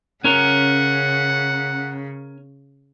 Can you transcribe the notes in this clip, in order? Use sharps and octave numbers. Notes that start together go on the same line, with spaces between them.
C#3 C#4 A#4 F#5